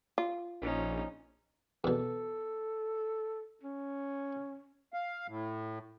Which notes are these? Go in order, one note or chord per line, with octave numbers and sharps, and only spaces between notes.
F4
A#1 C#4 D#4
E2 B2 A4
C#4
F5
A2